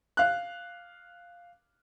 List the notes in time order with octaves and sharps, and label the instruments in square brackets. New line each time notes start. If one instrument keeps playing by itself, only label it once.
[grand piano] F5 F#6